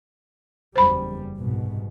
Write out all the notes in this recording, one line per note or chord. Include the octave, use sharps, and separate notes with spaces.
F#1 E2 G3 C5 B5
C2 G#2 B2